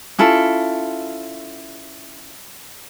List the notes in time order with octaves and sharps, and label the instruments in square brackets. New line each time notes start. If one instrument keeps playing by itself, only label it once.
[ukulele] C#4 E4 F4 A4